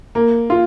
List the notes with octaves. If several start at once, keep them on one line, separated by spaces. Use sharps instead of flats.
A#3
F4